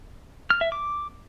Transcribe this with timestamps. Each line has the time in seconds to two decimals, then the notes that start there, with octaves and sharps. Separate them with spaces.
0.50 F6
0.61 E5
0.72 D6